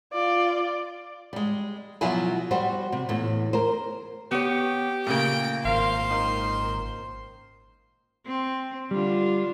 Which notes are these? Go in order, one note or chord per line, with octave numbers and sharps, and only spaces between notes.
F4 D5
G3 G#3
B2 F3 F#3 E4 G#5
G3 F#4 C5
C3
E2 A2
A#4 C5
B3 G4 C#5
A#2 C#3 A3 A#3 G5 D7
G#1 A#4 C5 F5 C6
D#3
C4
D3 G3 D4 F4